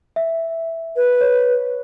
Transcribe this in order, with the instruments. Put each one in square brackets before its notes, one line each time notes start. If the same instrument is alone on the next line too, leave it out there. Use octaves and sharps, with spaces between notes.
[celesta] E5
[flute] B4
[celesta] C#5